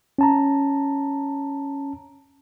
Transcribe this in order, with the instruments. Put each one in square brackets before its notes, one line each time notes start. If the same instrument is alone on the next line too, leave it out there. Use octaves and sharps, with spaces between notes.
[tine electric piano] C#4 A5 A#5